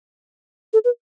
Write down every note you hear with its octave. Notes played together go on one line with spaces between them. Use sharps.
A4
B4